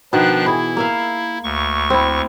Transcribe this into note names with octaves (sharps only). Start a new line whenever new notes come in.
B2 D#3 F3 D4 F#6
E3 E4 G#4
A#3 E5 F5
D2 C#6
C4 E4